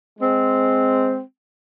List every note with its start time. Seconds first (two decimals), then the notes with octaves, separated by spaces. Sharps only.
0.20 G#3 C4